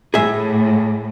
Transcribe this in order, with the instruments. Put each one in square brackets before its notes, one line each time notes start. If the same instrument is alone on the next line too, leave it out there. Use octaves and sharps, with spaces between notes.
[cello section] A2 [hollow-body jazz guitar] G#4 E5